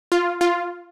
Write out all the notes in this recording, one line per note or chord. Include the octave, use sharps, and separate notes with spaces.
F4
F4